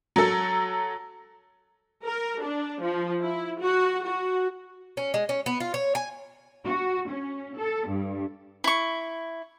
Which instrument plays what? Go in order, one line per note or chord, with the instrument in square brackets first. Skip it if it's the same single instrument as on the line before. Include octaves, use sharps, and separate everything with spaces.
[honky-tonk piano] F#3 A4
[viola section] A#4
D4
F3
E4
F#4
F#4
[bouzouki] C#4
G#3
C#4
B3
F4
C#5
G#5
[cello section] F#4
C#4
A4
G2
[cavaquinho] E4 C#6